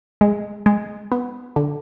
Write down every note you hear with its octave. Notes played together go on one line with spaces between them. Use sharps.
G#3
G#3
B3
D3